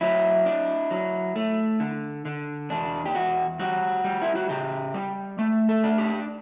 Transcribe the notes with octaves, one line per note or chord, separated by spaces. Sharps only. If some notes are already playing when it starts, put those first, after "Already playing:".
F#3 E4
D4
F#3
A3
D3
D3
E2 D4
G4
E2 F#4
G3 F#4
G3
E4
F#4
C#3 G4
G3
A3
A4
D4
G4